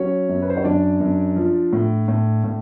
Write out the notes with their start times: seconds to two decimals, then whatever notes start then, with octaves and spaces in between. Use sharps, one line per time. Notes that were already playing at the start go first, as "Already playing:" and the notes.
Already playing: F#3 C#4 C#5
0.29 F#2
0.42 B4
0.50 C5
0.57 C#5
0.64 F#2 D4 D5
1.00 F#2
1.36 F3
1.73 A2
2.08 A2
2.44 A2